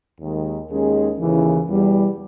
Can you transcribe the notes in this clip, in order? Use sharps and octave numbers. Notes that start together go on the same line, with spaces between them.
D#2 D#3 G#3
D#2 D#3 G#3 C#4 G#4
D#2 C#3 E3
E2 B2 G3